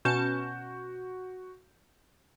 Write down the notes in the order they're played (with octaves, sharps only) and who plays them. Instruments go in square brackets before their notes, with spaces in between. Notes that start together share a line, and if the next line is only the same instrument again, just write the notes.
[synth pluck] B2 C#4 A5 [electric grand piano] F#4 G6 E7